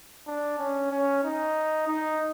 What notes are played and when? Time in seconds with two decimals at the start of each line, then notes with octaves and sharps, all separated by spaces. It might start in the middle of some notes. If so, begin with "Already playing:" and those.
0.27 D4
0.59 C#4
0.91 C#4
1.24 D#4
1.88 D#4